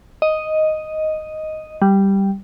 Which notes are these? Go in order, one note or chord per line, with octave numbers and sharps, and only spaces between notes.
D#5
G3